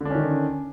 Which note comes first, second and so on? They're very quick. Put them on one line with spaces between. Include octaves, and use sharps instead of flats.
D3 D4 C#4 D#3